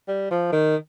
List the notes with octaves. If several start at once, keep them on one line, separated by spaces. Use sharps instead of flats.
G3
F3
D#3